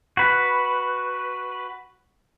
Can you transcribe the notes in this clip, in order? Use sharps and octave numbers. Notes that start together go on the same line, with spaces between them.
F#4 B4